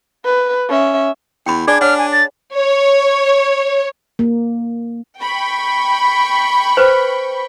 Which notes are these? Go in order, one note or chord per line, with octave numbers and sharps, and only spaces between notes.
B4
C#4 E5
E2 G5 B5
D4 G#4 D5 G#5 G#6
D4 C#5 F#5 F6
G#5
A6
C#5
A#3
G5 B5 C#6
B4 C5